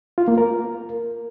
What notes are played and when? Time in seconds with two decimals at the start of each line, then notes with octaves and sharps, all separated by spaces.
0.18 F4
0.28 A#3
0.38 A#4